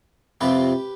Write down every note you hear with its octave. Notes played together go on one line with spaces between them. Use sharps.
F2 C3 F3 C4 G4 B4